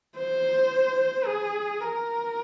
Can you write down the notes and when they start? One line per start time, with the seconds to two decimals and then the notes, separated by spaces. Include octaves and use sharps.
0.17 C5
1.26 G#4
1.80 A#4